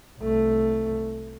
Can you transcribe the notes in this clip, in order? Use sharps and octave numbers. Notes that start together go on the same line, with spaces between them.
C2 A3